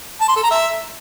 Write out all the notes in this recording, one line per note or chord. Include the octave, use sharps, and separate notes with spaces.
A5
C6
A4
A#5
E5